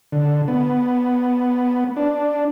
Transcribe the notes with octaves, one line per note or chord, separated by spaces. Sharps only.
D3
B3
D4